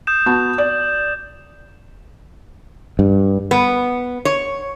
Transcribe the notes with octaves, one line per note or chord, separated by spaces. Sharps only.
D#6 G6 E7
B3 F#4 A5
D5
G2
B3
C#5